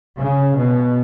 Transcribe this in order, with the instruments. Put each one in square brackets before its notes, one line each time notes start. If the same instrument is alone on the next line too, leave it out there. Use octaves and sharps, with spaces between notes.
[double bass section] C#3
B2